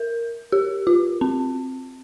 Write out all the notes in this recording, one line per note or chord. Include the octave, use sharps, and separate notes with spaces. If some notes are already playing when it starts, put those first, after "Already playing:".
Already playing: A#4
G4
F4
C4